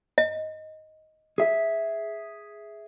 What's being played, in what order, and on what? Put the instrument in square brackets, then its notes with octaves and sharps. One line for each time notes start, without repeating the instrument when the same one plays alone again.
[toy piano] D#5
[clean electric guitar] G#4 E5